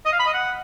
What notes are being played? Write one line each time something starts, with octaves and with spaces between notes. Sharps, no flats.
D#5
F5
B5
D#5
F#5